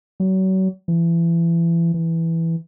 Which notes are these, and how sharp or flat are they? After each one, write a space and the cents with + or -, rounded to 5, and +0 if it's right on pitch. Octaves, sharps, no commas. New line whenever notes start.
F#3 +35
E3 +30
E3 +0